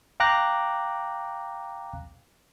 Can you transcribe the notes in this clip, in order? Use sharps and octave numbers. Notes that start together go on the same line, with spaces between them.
F5 G5 A#5 D6 F#6 A#6